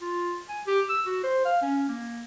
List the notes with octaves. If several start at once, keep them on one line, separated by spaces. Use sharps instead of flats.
F4
G#5
G4
E6
F#4
C5
F5
C#4
A#3